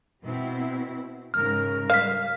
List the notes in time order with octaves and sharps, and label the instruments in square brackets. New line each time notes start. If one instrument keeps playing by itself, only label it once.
[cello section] B2 C4 E4
[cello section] G#2 C#3 A#4 [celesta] F6
[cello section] G3 [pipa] F5 [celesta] F6 B6